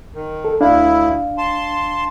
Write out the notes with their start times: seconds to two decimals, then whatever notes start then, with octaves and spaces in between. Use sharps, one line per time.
0.14 D#3
0.45 A4
0.61 D2 D4 E4 F5
1.38 A5 C6